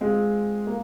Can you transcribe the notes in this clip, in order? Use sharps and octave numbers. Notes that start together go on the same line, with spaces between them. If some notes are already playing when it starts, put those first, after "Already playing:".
G#3 C4 F4 G#4
A#3